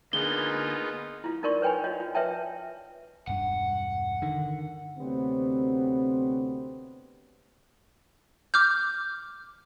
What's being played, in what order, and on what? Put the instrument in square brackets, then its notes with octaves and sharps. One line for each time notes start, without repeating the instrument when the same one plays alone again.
[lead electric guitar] D3 A#3 [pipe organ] B3 D#4 F4 [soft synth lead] G#4 [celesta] G7
[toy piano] E4 F4
D#4 F4 A#4 D5 C6 C#6
B4 C#5 G5 G#5 B5
F4 F#4 C#5 D#5
F4
B4 C#5 E5 G5 A5
[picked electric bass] E1 G2 [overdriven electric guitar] F#5
[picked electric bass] D3 D#3
[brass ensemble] D2 C3 F#3 B3 C4
[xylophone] D6 F6 G6